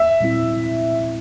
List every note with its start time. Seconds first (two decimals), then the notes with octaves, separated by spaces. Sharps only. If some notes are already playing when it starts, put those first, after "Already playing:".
Already playing: E5
0.20 A#2 G3 C4 E4